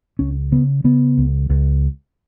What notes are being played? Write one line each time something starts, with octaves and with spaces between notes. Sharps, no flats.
C#2 C#4
C#3 B3
C#3 B3
C#2
C#2